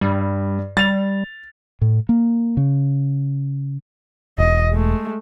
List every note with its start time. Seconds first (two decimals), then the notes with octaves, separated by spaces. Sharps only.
0.01 G2 G3
0.77 G3 A6 F7
1.82 A2
2.09 A#3
2.57 C#3
4.38 E1 D#5
4.71 G#3 A3